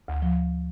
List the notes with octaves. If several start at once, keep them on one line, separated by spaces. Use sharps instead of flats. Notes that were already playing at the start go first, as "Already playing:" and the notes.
D2
F3